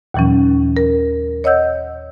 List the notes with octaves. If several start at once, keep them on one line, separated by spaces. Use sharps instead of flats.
D#2 A#2 E3 F#3 C#4
A#4
C#5 D#5 F#5 E6 G6